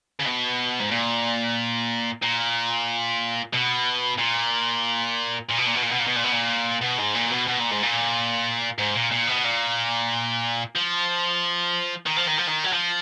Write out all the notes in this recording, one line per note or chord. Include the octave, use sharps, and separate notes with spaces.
C#3
B2
G#2
A#2
A#2
B2
A#2
A#2
B2
A#2
B2
A#2
B2
A#2
B2
A#2
B2
A#2
B2
G#2
A#2
B2
B2
A#2
G#2
A#2
G#2
A#2
A#2
B2
A#2
F3
D#3
F3
D#3
F3
D#3
F#3
F3